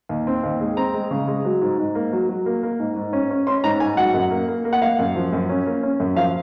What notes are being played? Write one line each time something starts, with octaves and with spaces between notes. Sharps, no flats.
D#2
C4
D#2
G#3
C4 A#5
G#3
C#3
G#3
F#3
G#2
G#2
A#3
F#3
F#3
A#3
A#3
G#2
G#2
C#4
C#4
C#4 C6
G#2 A#5
G#2 G#5
F#3 F#5
F#2
A#3
A#3
A#3
F#5
A#3 F5
F#2
F3
F#2
C#4
A#3
C#4
F#2
F3 F5